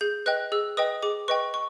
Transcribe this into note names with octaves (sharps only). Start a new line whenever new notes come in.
G#4 G6
B4 D#5 G5 F#6
G#4 E6
B4 D#5 G5 D#6
G#4 D6
B4 D#5 G5 C#6
C#6